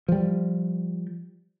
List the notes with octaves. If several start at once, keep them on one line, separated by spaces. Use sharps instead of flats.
F3 G3